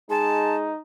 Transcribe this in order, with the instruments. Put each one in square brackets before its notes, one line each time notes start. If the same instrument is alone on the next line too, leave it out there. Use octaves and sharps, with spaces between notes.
[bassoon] G#3 [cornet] D#4 [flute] A5